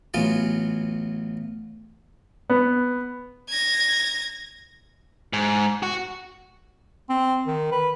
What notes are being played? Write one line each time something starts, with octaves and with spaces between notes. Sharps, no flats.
A1 F#3 B3 F4 G#5
B3
G#6 A#6
G#2
F#4
C4
D#3
B4